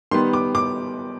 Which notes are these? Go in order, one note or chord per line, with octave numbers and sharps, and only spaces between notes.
D#3 G3 B3 C6
D6
D6